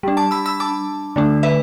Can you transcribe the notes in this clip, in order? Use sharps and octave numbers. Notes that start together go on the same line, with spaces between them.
G3 D4
A5 D6
B5 E6
B5 E6
A5 D6
D3 A3 D4
B4 E5